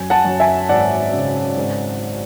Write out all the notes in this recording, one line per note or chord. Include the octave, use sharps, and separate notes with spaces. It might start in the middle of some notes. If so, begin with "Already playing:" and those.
Already playing: F#2 G#5
F#5 A5
F#2
E5 G#5
G#1 D5 F#5
C#3
G#1